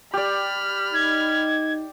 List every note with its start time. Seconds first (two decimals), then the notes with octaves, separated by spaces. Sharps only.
0.14 G4 D5 B5 F6
0.94 D#4 G#6